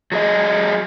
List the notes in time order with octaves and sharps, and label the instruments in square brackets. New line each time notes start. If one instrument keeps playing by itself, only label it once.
[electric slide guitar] F#3 G#4 D#5